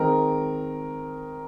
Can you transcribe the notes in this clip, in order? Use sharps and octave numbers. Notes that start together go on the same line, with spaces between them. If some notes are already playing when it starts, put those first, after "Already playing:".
Already playing: D#3 G#3 C4 D#4 A#4